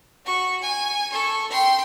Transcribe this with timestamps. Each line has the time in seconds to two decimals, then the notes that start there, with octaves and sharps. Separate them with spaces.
0.25 F#4 C#6
0.63 G#5
1.12 A4 C#6
1.51 G5 C6